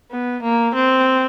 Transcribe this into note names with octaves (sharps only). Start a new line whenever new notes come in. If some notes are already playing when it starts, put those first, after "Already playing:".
B3
A#3
C4